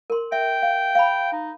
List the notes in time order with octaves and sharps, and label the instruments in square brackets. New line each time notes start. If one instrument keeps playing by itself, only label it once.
[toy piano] A#4 C6
[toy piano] E5 [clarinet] G5
[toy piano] F5
F5 B5
[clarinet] D#4